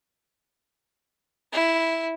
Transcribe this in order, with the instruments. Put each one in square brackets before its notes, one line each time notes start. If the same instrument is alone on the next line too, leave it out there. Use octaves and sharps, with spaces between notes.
[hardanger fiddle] E4